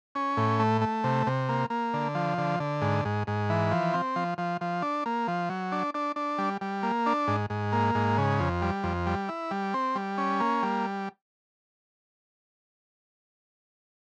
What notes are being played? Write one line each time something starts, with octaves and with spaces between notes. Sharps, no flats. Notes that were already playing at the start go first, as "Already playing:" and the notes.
C#4
A2
A3
A3
C3
C3
A#3
A#3
D3
F3
D3
D3
G#2
G#2
G#2
E3
F3
C4
F3
F3
F3
D4
A#3
F3
F#3
D4
D4
D4
G3
G3
A#3
D4
G#2
G#2
A#3
G#2
C#3
F2
G3
F2
G3
E4
G3
C4
G3
C#4
A#3
G3